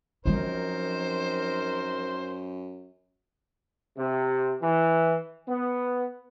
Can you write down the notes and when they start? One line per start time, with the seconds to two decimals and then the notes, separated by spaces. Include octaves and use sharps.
0.26 F#2 F3 C4 D#4 F4 A#4 C5
3.97 C3
4.61 E3
5.49 B3